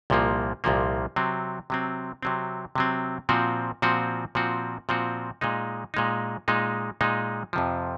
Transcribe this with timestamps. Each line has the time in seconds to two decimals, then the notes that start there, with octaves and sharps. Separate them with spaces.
0.10 C2 A#2 F3 A#3
0.64 C2 A#2 F3 A#3
1.16 C3 F#3 C4
1.70 C3 F#3 C4
2.23 C3 F#3 C4
2.75 C3 F#3 C4
3.29 A#2 F3 C4 F#4
3.82 A#2 F3 C4 F#4
4.35 A#2 F3 C4 F#4
4.89 A#2 F3 C4 F#4
5.41 A#2 G#3 D#4
5.94 A#2 G#3 D#4
6.48 A#2 G#3 D#4
7.01 A#2 G#3 D#4
7.53 F2 C3 F3